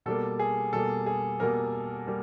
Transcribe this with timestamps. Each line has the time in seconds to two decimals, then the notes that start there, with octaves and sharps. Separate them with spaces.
0.06 B2 G3 A#3 A4
0.39 G#4
0.73 B2 G3 A#3 A4
1.06 G#4
1.40 B2 G3 A#3 A#4
2.07 G3 A#3